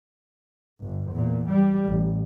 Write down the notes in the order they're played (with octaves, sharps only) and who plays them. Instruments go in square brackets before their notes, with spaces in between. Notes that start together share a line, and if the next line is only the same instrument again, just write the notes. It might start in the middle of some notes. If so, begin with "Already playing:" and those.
[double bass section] G1
E2 A#2
G3
A1